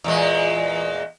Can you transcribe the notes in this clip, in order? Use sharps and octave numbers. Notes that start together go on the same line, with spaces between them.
E2 A#2 G#3